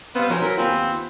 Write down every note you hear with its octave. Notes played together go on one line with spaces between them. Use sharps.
G3 B3 C4 C5 F5
F3 F#3 D#4 A#4 G#5
E4 A#4 B6
D#2 B3 C4 F4 G#5